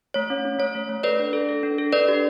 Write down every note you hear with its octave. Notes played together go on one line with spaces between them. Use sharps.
A3 C#5
C#4
C#4
A3 C#5
A3
A3
A4 B4 D5
D4
A4
A4
D4
A4
D4 B4 D5
G4